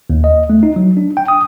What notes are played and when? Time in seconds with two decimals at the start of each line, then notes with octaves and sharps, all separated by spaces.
0.10 D#2
0.24 D#5
0.50 A3
0.63 D#4
0.76 F#3
0.97 D4
1.17 G5
1.28 D#6